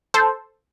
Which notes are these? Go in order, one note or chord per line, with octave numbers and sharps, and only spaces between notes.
A4 C5